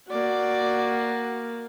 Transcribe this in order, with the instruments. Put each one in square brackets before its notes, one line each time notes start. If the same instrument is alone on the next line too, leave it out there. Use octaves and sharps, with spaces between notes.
[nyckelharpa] A#3 [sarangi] F#4 [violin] D5